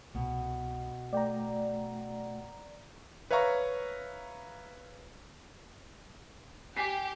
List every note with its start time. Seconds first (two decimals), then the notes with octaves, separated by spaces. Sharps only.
0.15 C2 B2
1.13 A3 D5 G5 A#5
3.31 B4 C#5 E5 F5 A#5 C#6
6.77 G4 G#5 B6 C7